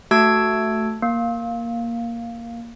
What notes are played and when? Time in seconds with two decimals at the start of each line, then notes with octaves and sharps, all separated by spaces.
0.11 A3 F#4 A5 E6 G#6 D7
1.02 A#3